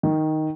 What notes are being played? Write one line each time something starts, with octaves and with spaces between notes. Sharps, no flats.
D#3